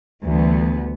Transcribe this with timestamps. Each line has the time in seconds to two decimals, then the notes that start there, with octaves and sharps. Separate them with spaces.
0.23 D2 E3 G3 B3